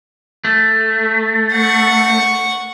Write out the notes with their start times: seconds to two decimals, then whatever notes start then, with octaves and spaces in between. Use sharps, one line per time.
0.45 A3
1.53 F#5 C#6